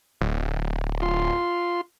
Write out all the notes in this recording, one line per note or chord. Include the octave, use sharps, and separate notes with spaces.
D1
F4 C6